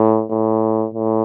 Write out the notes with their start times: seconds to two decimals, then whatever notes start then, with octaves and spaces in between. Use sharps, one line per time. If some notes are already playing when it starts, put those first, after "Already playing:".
Already playing: A2
0.31 A2
0.94 A2